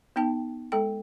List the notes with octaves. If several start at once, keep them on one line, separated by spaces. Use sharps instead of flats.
B3 D#4 G5 A5
G#3 A4 G5